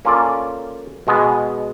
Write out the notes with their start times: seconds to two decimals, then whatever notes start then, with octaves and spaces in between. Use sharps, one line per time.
0.05 A#3 C#4 F4 A4 D5
1.07 B2 G#3 B3